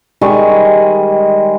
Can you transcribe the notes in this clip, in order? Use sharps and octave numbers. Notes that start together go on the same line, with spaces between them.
D#3 G3 G#3 C#6